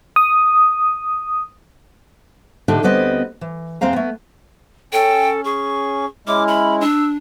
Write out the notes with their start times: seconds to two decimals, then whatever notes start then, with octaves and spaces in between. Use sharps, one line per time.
0.16 D#6
2.68 A2 D3 D4 D#4 G4 A4
2.83 D2 G3 B3 C4 B4 D#5
3.41 E3
3.81 E2 G#3 C4 C5 F5 A#5
3.93 A3 B3
4.93 C#4 A4 G5
5.45 G#4 C#6
6.27 G#3 C#4 E4 D6 F6
6.48 B5
6.81 D4 E6